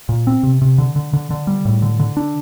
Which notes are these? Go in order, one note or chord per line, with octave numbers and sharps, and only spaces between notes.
A#2
C4
C3
C3
D3
D3
D3
D3
G3
A2
D3
D3
D4